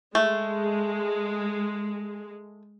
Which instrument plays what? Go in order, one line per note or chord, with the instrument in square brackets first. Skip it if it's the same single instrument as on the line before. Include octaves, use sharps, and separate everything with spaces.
[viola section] G#3 [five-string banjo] A3